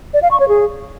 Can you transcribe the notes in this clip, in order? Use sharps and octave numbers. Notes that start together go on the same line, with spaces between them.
D5
F5
C#6
C#5
G#4